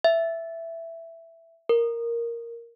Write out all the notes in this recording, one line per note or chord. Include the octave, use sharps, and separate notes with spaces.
E5
A#4